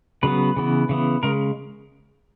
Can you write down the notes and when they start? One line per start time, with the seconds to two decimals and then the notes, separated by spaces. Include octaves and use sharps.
0.23 C#3 F#3 B3 B4
0.56 C#3 E3 B3
0.89 C#3 E3 B3
1.23 C#3 G#3 A#4